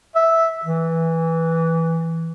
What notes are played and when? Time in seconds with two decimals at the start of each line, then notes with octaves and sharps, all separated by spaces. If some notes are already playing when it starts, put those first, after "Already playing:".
0.16 E5
0.65 E3